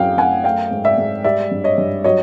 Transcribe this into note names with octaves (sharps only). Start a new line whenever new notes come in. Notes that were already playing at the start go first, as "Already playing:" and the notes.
Already playing: F#2 A2 F#3 F5 G5
F#2 F#5 G#5
A3 F5 G5
G#2
D5 E5
G#2
G3 D5 E5
G2
C#5 D#5
G2
F#3 C#5 D#5